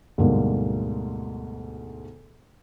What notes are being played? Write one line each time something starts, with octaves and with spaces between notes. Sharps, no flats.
D2 G#2 B2 G3 A#3